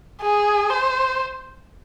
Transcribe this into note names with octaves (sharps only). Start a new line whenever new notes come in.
G#4
C5